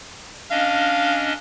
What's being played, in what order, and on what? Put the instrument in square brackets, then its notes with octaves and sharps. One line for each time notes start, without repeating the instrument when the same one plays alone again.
[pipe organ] C#4 D4 D#5 [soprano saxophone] F5